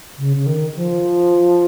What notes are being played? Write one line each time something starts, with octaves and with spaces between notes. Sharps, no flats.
C#3
C#3
D#3
F3